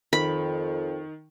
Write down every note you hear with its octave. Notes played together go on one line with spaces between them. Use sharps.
F2 D#3 B5